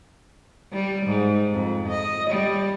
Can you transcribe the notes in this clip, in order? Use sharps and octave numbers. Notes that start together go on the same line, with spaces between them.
G3
G#2
F2
D#5
G3